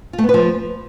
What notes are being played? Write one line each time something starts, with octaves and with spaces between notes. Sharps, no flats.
F4
A3
B3
B4
F3